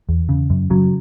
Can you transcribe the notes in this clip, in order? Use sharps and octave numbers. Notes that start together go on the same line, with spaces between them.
E2
C#3
F#2
C#3 F#3